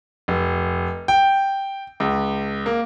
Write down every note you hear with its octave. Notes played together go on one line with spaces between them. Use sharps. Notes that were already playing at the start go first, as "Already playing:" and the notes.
F1
G5
C#2
A#3